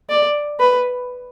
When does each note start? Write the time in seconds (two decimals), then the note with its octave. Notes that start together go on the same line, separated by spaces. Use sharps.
0.10 D5
0.60 B4